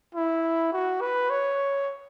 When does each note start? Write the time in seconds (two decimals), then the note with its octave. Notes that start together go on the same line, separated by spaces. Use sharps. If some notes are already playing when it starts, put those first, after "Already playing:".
0.15 E4
0.72 F#4
1.01 B4
1.30 C#5